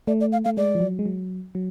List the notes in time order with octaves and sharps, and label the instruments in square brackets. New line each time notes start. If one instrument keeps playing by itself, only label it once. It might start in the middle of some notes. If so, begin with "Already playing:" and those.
[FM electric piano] A3 [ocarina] D5
[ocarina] D5
F5
[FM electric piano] A3 [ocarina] F5
[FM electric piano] G#3 [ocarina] D5
[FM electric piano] F3
F#3
G#3
F#3
F#3